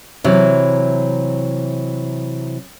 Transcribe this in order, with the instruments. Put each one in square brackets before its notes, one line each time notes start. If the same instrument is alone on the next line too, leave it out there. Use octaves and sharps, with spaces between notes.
[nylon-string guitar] C3 E3 F#3